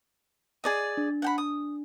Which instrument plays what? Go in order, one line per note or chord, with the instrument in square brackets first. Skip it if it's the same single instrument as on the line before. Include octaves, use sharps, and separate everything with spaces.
[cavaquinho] G#4 D5 D#5
[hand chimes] D4
[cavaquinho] F#5 G5 B5
D#6